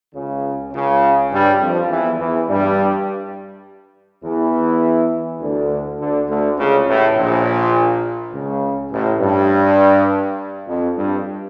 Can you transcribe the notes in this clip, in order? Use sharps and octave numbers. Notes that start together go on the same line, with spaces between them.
C#2 C#3
C#2 C#3
G2 G3
F2 F3
E2 E3
E2 E3
G2 G3
E2 E3
D2 D3
D2 D3
D2 D3
C#2 C#3
A1 A2
A#1 A#2
C#2 C#3
A1 A2
G2
F2
G2